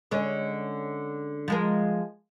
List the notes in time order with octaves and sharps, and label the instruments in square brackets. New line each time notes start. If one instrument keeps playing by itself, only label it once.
[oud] D3 G#3 C#4
F3 G#3 A#4